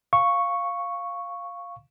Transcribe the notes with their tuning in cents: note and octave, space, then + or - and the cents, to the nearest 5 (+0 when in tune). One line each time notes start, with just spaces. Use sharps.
F5 +0 C#6 +0